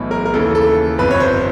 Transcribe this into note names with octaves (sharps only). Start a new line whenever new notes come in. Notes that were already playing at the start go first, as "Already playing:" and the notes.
Already playing: B1 A2 E3
A#4
A#4
D#2 C#3 E3 A4
A4
G1 F2 C3 B4
C#5
C5